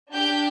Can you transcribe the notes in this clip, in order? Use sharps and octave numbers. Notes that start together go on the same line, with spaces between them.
D4 G4 G6